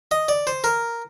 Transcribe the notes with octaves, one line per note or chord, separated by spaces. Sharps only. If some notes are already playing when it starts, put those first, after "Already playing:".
D#5
D5
C5
A#4